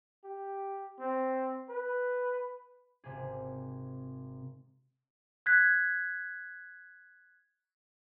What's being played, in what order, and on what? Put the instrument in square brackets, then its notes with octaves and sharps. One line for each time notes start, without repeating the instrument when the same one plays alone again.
[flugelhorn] G4
C4
B4
[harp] G#1 C3 G#4
[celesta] F#6 G#6 B6